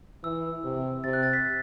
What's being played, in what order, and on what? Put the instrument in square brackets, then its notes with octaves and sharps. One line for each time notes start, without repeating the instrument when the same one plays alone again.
[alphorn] E3 [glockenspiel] E6
[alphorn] C3
[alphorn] C3 [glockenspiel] A6
[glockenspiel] F#6
A6
B6